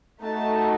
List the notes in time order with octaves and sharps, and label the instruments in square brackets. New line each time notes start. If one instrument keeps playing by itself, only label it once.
[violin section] A3 D#4 F#4 A5